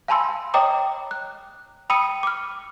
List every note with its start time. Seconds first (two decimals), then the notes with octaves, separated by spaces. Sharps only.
0.08 F5 G#5 A5 B5 C6 E6
0.54 C#5 D#5 G5 A#5 D6 D#6
1.11 F#6
1.90 G5 B5 D#6 E6 C#7 D#7
2.23 D6 F6